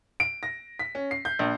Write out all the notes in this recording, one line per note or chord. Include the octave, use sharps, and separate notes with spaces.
D7
A#6
B6
C#4
C7
G6
A#1